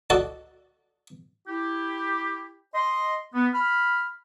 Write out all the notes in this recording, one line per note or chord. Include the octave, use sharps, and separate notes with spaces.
F#4 A4 D5 D#5
E4 G4
D#5 C6
B3
B5 F6